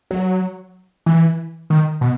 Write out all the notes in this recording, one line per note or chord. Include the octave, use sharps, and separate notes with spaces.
F#3
E3
D#3
B2